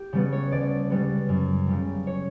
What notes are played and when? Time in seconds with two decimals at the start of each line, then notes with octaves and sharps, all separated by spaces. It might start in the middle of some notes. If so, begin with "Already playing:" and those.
Already playing: G4
0.13 C#3 G3 B3
0.32 C#5
0.51 D2 D5
0.90 C#3 G3 B3
1.29 F#2
1.68 C#3 G3
2.07 C#5